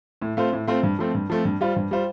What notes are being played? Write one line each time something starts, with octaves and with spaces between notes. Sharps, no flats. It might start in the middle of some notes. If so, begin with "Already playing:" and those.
A2
A3 C4 F4 C5
A2
A3 C4 F4 C5
G2
F3 A3 C4
G2
F3 A3 C4
G2
G3 F4 C5
G2
G3 F4 C5